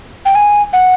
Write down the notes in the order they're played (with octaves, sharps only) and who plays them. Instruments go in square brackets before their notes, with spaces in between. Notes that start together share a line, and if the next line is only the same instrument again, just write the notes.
[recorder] G5
G#5
F#5